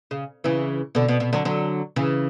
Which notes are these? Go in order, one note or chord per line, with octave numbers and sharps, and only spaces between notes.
C#3
C#3 E3
B2 D3
B2
B2
D3 F#3
D3 F#3
C#3 E3